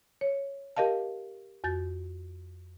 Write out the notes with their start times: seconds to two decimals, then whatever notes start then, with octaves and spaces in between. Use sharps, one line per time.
0.21 C#5
0.76 G4 A#4 D#5 F5 A5
1.64 F2 F#4 G6 A6